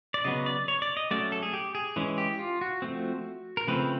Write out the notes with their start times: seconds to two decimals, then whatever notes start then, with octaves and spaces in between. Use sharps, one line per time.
0.14 D5
0.24 C#3 F#3 B3 D#5
0.46 D5
0.68 C#5
0.82 D5
0.97 D#5
1.11 F#3 A3 C#4 D5
1.32 A4
1.43 G#4
1.53 G4
1.75 G#4
1.96 E3 G#3 C#4
2.18 G4
2.39 F4
2.61 F#4
2.82 F3 A3 C4
3.57 A#4
3.67 C#3 F3 A3 C4 B4